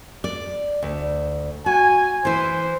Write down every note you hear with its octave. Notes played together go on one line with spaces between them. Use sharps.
D5
D2
F#4 G#5
E3 E4 C5